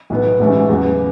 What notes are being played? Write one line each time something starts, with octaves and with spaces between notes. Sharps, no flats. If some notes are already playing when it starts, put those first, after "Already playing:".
B1 A2 F#3 B3
A1 G#2 E3 A3 C#4
E2 C#3 F#3 B3